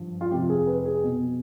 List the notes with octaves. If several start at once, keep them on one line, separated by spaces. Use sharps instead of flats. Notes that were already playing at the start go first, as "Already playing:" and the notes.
Already playing: G2 F3
F4
F2 C3 F3 G4
G#4
B4
G#4
B2